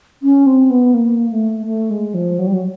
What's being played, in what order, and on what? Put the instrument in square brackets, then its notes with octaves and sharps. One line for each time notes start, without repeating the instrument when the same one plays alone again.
[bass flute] C#4
C4
B3
A#3
A3
A3
G#3
F3
F#3
G3
F#3